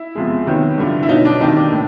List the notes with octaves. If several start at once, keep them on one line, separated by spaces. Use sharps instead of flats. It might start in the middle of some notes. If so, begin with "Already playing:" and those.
Already playing: E4
E2 C3 F3 G#3
C3 D#3 F#3 B3
G2 D3 F3
E4
B2 F#3 B3 D#4
D4
C3 D#3 G3 A#3 D#4
D4
A2